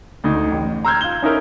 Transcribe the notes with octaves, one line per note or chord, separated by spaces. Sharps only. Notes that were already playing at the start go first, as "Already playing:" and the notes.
D2 D#4
A1
A#5 C6 E6 F6 G6 G#6
F4 G7
C#4 D#4 E4 A#4